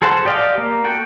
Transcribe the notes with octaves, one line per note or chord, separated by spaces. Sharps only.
G#4 A4 C5 F#5 A5
G4 D5 D#5 F5 G5
A#3
F#4 A4 G5